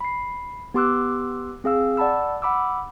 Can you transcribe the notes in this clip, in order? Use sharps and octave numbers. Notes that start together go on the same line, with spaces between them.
B5 C7
B3 G4 C6 D6 E6 F#6
C4 G#4 F5 E6
D5 F#5 A5 B5 E6
F#5 B5 D6 E6